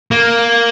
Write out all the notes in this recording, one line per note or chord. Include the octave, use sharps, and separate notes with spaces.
A#3